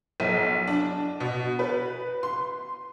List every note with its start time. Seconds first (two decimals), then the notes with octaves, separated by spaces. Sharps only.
0.20 B1
0.67 D4
1.20 B2
1.59 B4
2.23 C6